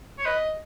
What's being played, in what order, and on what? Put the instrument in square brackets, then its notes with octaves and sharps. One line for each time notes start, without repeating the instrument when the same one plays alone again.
[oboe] C#5
[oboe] B4 [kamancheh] D#5